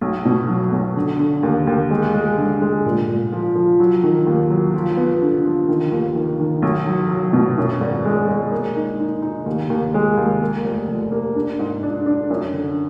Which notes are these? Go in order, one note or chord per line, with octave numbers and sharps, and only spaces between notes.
B1
B2
F#3
B1
D3
D3
D#2
D#2
G#3
G#3
D3
G#3
A#2
A#2
F3
F3
F#3
D#3
D#2
F#3
F3
B3
D3
F3
D#3
D#2
D#3
D#3
B1
F#3
F#3
B2
F#2
G#1
G#3
G#3
A#3
D#4
D#4
D#4
D#2
D#2
G#3
D#2
A#3
F1
F1
A#3
D4
G#2
D4
D4
F#2
D3